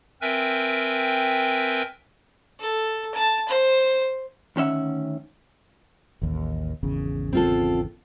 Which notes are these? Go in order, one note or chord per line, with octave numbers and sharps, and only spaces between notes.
C4 A#4 B4 E5 G5 G#5
A4
A5
C5
D2 D#3 C#4 E5 F#5
A1 D#2
G#1 E2 C#3
C4 F4 A4